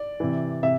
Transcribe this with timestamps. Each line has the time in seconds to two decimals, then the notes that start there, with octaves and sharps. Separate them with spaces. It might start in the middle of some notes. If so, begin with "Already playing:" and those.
Already playing: D5
0.20 C3 E3
0.63 C3 E5